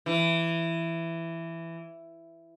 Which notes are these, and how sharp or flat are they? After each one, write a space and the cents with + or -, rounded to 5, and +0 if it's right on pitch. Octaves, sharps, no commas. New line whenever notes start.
E3 +10